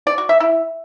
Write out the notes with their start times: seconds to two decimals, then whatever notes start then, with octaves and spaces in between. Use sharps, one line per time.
0.07 D5
0.18 F#4
0.29 E5
0.40 E4